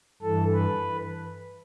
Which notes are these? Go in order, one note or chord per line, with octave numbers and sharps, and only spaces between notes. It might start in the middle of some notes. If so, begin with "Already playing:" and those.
G2 E3 A4
B4